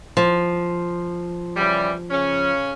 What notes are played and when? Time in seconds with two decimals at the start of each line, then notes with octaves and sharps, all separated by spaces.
0.17 F3
1.56 C#3 E3 G3
2.10 C#3 C#4